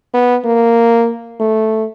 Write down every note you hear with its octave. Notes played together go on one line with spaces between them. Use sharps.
B3
A#3
A3